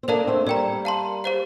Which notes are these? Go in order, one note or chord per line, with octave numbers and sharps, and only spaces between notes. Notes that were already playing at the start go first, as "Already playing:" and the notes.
C4
A#3 D4 A4 D5 F5 A5
A3 C4
G3 A#3 D5 G5 A#5
F5 A5 C6
G4 C5 F5